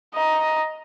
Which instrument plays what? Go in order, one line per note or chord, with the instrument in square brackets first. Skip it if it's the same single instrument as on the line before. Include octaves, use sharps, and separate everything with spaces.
[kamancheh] D#5 A#5